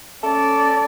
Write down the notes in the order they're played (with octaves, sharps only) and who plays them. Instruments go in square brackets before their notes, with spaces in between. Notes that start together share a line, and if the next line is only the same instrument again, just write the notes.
[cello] C#4 D5 [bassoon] A4